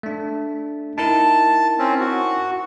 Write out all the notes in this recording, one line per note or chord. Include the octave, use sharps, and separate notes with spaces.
A3 D4
D#4 E4 A#4 A5
C4 C#4
F#4